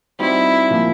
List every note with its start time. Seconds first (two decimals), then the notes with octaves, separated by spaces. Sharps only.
0.19 G3 C4 D#4 E4 F#4
0.70 A#2 F3 A#3